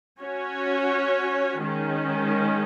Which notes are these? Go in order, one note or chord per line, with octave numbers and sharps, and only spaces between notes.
C#4 F#4 C#5
D#3 G#3 C#4